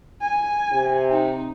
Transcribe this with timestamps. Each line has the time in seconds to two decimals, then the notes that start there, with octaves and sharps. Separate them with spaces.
0.21 G#5
0.73 C3
1.11 D#4